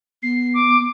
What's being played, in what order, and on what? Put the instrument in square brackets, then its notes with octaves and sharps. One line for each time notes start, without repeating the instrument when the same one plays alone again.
[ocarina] B3 [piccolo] C7
[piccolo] D6